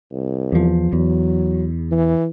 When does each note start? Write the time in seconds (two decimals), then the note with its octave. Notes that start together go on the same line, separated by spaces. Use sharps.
0.12 C2
0.52 E2 F3
0.93 E2 F#3
1.92 E3